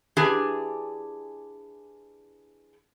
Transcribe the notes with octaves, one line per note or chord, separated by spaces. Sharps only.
E3 D4 G4 G#4